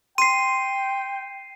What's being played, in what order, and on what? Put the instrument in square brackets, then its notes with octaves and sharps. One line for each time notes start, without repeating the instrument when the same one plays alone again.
[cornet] G5 [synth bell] C6 [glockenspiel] C7 D#7